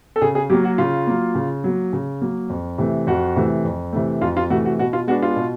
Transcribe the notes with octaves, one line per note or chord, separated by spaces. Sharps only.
A4
C#3 G#4
G#4
F#3 A#3 G4
F#4
C#3 F4
F#3 A#3
C#3
F#3 A#3
C#3
F#3 A#3
F2
C3 E3 A3
F2 F#4
C3 E3 A3
F2
C3 E3 A3
F2 F4
F4
C3 E3 A3 F#4
F#4
B2 F#4
F4
G#3 B3 D4 F#4
F4
B2